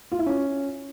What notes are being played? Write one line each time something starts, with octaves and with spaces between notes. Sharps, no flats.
F4
E4
C#4